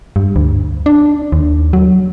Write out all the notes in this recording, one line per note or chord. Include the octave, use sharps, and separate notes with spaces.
G2
D2
D4
D#2
F#3